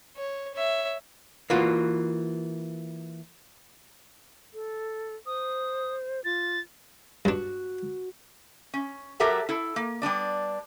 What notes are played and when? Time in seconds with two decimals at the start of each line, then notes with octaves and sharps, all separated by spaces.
0.16 C#5
0.55 C#5 E5
1.50 E3 A#3 F4 F#4
4.54 A4
5.26 C5 D#6
6.25 F4 A6
7.25 G2 D4 F#4
8.74 C#4
9.20 F#3 G4 A4 A#4 E5 F#5
9.49 E4 A4
9.76 A#3
10.02 G3 B3 D4 D5